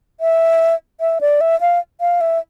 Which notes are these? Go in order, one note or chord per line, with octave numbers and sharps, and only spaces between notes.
E5
E5
D5
E5
F5
F5
E5